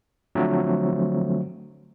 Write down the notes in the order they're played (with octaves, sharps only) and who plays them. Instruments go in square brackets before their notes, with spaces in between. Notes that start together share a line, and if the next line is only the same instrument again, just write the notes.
[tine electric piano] D3 F3 F#3 A3 C4